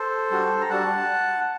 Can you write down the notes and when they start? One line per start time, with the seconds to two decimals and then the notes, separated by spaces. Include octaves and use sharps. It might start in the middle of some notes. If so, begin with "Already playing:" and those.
Already playing: A4 C5
0.31 G3 D4 F#4
0.61 A#5
0.70 G3 D4 F#4 F#5 A5